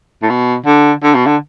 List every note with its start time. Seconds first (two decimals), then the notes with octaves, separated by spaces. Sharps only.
0.23 A2
0.30 B2
0.66 D3
1.03 D3
1.15 B2
1.26 D3